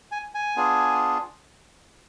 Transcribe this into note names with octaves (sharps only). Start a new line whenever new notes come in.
G#5
G#5
B3 D4 F4 G#4